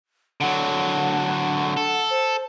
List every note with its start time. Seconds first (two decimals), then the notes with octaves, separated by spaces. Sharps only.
0.41 D3 F#3 F#5
1.77 A4
2.10 C5